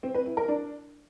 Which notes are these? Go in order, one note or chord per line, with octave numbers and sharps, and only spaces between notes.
C4
B4
E4
A#4
D4